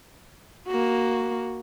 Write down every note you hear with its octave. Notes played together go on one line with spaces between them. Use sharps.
A#3 F#4